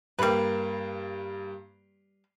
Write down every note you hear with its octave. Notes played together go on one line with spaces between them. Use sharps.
G2 G3 A#3 B4